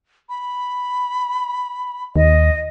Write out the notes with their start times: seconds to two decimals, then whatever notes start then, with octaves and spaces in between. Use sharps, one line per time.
0.29 B5
2.16 D#2 D#5